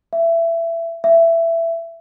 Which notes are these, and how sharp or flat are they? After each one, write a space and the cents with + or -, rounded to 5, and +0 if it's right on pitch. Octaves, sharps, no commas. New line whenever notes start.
E5 +20
E5 +15